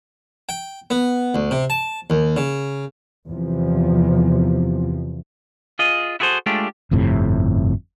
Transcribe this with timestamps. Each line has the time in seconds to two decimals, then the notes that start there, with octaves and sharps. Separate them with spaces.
0.49 G5
0.90 B3
1.35 D2
1.51 C3
1.70 A5
2.10 D#2
2.37 C#3
3.27 E2 C3 F3
5.79 F4 G#4 D#5
6.20 E4 F#4 G#4 A4 C5
6.46 G#3 A3 D4 F4 G4
6.91 G1 F2 A2 C3